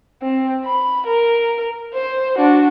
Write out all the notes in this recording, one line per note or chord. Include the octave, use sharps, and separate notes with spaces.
C4
B5
A#4
C5
D4 F#4